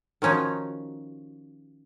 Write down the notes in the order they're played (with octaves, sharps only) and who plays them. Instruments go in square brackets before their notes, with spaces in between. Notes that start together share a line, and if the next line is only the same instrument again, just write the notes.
[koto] D#3 F3 C#4 D#4 F#4